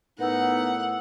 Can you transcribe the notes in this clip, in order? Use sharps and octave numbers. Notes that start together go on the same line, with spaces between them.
A2 B3 D#4 A#4 F#5 E6